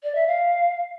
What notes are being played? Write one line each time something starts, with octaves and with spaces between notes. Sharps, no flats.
D5
E5
F5